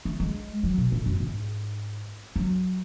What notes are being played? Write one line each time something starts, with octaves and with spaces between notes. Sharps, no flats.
A3
G#3
F#3
B2
A2
F#2
G#2
F#3